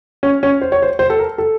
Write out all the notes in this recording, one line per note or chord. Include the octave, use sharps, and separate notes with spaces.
C#4
C#4
C5
C#5
C5
C5
A4
A#4
A4